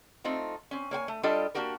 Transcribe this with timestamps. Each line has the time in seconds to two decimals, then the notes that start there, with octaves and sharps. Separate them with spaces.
0.24 A3 C4 D#4 F4
0.71 C4 C#4
0.91 A#3 C#5 G5 G#5
1.08 A3
1.23 G3 D4 F4 G4 A4 D#5
1.55 A#3 D4 F#4 G4 A#4